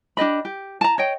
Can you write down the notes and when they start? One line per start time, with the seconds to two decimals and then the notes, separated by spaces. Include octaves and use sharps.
0.17 D4 G4 D#5 B5
0.45 G4
0.81 A5 A#5
0.98 C#5 D#5 G5